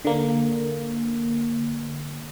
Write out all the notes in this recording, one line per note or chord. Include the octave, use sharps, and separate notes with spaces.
D3 A#3